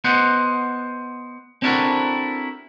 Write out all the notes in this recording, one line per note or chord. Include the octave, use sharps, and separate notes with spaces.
B3 C5 D#5 F#5
C4 D4 E4 F#4 A4 A#4